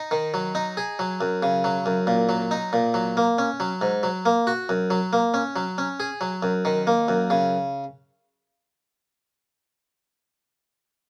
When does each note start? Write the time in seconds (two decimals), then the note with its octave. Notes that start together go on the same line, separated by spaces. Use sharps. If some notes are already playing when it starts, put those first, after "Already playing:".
Already playing: D#4
0.11 D#3
0.34 F#3
0.55 D#4
0.77 G#4
0.99 F#3
1.21 F#2
1.43 C#3
1.64 F#3
1.86 F#2
2.07 A#2
2.29 F#3
2.51 D#4
2.73 A#2
2.94 F#3
3.17 A#3
3.38 C#4
3.60 F#3
3.81 G#2
4.03 F#3
4.26 A#3
4.47 F#4
4.69 F#2
4.90 F#3
5.13 A#3
5.34 C#4
5.56 F#3
5.78 C#4
6.00 G#4
6.21 F#3
6.43 F#2
6.65 D#3
6.87 A#3
7.08 F#2
7.30 C#3